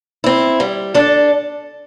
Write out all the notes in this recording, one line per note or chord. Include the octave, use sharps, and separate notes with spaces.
C4 E4
G3
D4 A4 D5